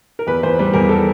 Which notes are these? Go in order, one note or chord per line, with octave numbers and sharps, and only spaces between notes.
A#4
E2 B4
E2 C5
G3 B4
E2 A#4
A4